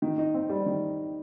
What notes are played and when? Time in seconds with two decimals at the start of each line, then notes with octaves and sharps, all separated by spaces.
0.02 D#3
0.18 D#4
0.35 C4
0.49 G3
0.66 D#3